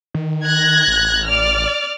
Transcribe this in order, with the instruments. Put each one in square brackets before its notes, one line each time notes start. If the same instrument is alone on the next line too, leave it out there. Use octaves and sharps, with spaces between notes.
[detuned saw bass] D#3
[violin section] F#6 G#6 A#6
[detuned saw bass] A1
[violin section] D5 F6